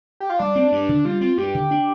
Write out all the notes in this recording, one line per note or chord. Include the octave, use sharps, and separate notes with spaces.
G4
F4
G3 D4
C4
G2
D3
G3 F4
C4 F4
G2 G4
D3
D4